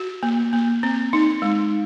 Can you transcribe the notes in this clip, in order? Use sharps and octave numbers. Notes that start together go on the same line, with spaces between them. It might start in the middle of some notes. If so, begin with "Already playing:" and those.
Already playing: F#4
A#3
A#3
C4
D#4
G#3